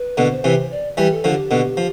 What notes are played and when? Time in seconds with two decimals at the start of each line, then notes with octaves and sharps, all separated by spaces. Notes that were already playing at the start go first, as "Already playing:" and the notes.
Already playing: B4
0.17 B2 D3
0.31 C5
0.44 C3 E3
0.71 D5
0.97 E3 G3
1.11 A4
1.24 D3 F3
1.31 G4
1.51 B2 D3
1.77 F3